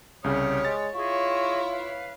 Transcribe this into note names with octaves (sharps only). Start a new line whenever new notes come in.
C2 C#3 G4 C#5 D#6 F6
G#3 A6
E4 F4 G#4 C#5 D#5 C#6
B4 F5